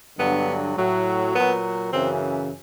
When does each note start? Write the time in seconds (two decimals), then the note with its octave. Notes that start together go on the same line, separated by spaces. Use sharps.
0.18 G2 D3 F#3 B3
0.76 A2 F#3
1.34 A#2 F#3 B3
1.91 F#2 C#3 E3 C4